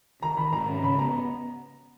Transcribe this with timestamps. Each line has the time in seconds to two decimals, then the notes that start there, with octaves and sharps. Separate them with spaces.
0.22 D#3 A#5
0.37 D#3 B5
0.53 G#2 A#5
0.68 C#4
0.83 C#3 B5
0.99 B3 A#5